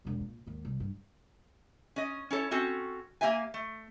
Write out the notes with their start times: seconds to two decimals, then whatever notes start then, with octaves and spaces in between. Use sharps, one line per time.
0.05 E1 F#2
0.21 A#2
0.47 D#2 G#2
0.65 C2
0.80 G2
1.96 C#4 D#5
2.30 C#4 E4 A4 C#5
2.51 C4 C#4 F#4 A4
3.21 A#3 G4 E5 G#5
3.54 A3